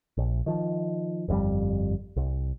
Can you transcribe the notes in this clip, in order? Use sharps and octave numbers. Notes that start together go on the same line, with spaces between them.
A#1
D#3 F3
G1 F2 C3 G3
C2